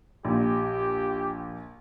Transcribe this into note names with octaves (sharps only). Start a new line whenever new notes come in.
A#1 G4